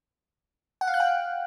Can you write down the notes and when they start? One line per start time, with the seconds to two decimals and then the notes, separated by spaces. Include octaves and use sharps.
0.81 F#5
0.87 F5
0.94 F#6
1.00 G5